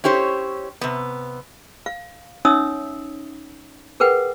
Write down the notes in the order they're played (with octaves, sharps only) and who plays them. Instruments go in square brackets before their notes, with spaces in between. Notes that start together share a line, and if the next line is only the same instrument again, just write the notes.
[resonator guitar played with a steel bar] C#4 E4 G4 C5 C#5
C3 B3
[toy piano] F5
C#4 D#4 C#5 E5 D#6 E6
G#4 A#4 B4 F#5 G5